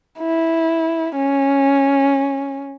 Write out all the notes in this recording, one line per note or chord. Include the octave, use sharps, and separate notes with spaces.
E4
C#4